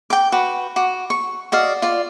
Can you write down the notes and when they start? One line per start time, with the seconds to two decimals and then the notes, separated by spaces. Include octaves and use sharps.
0.10 G5 D6
0.32 F#4 B4
0.76 F#4 D6
1.10 C#6
1.52 F#4 D5 D#5 F5
1.82 F4 D5